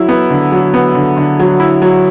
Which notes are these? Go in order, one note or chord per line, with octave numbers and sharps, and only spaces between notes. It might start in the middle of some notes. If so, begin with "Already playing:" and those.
Already playing: F#3 E4
B3
D3
F#3
B3
D3
D3
F#3
E4
F#3